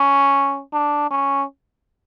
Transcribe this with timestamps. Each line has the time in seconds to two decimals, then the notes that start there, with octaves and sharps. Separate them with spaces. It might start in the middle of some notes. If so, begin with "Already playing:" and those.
Already playing: C#4
0.73 D4
1.11 C#4